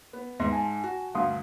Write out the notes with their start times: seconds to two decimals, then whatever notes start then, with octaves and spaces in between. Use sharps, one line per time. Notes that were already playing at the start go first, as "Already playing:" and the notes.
0.13 B3
0.40 D#2 G#2 B3 E5 C6 A#6
0.52 G#5 A5
0.84 F#4
1.15 D2 G2 F5 C6 D#6